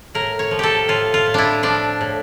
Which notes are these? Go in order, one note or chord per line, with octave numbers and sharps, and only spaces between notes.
A2 A#4
C#5
F3
G4 A4
A2 F4
F4
A2
D4 E4
F3 D4
A2